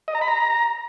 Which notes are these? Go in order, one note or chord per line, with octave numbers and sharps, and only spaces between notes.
D#5
A#5
B5
A#5